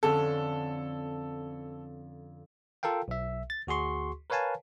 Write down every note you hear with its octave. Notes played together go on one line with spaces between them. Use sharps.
F2 D3 C#4 A4
F4 A4 A#4 F5 G5
B1 E5
A6
D2 F#4 G#4 C6 C#6
A#4 B4 C#5 F5 G#5 A5